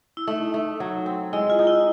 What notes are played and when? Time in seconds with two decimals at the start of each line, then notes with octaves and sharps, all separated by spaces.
0.17 E4
0.27 A3 D#4
0.54 A3
0.80 F#3
1.06 C4
1.33 G#3 E4
1.50 F4
1.59 D#4
1.67 E4